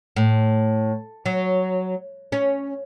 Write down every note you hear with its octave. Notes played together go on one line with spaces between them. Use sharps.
A2
F#3
C#4